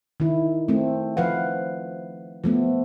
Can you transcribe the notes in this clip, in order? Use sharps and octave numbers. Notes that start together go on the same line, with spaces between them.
D#3 E4
A3 C4
F3 B4 F5 F#5
F3 A3 B3